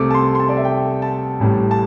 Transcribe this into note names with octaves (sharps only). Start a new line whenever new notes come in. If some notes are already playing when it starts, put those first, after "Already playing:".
Already playing: C2 C3 A3 D6
A5
C6
C6
A5
D5
E5
G5
A5
A1 A2 G3
A5